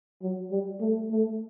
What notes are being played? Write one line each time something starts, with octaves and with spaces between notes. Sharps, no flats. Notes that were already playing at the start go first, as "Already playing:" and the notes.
F#3
G3
A3
A3